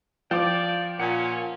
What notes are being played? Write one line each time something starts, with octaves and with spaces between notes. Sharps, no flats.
F3 D5 G5 D6
A#2 C#4 F#5